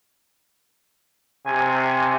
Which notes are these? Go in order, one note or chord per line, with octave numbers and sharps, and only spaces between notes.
C3 G#5